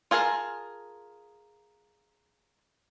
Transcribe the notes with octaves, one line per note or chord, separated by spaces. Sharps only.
F4 G#4 A#4 F5 A5